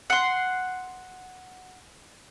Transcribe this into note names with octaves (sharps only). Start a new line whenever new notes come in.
F#5 C6